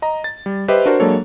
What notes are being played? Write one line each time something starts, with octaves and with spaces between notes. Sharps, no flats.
D#5 A#5
A6
G3
G4 B4 C5 D#5 E5
D4 F#4 A#4 C5
F#3 G#3 A#3 D4 A4 C#5